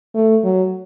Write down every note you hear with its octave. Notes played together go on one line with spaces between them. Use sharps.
A3
F#3